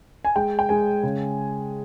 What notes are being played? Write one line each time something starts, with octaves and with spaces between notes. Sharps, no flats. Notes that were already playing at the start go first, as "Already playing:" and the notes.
G#5
G#3 G5
G5
G#3 G#5
C#3